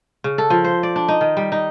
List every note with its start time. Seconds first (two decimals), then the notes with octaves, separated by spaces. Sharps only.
0.24 C#3
0.38 A4
0.50 F3
0.64 C5
0.83 D5
0.96 D4
1.08 D#4
1.21 D#3
1.37 G3
1.52 D#4